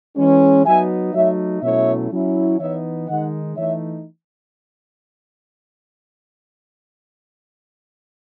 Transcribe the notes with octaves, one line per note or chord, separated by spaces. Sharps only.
E3 G#3 C#4
F#3 B3 D#4 E5 G#5
F#3 A3 D#4 C#5 E5
B2 F#3 A3 C#4 E4 C#5 E5
F#3 C#4 E4
E3 B3 D#4 C#5 E5
D#3 G#3 D#4 D#5 F#5
E3 A3 D#4 C#5 E5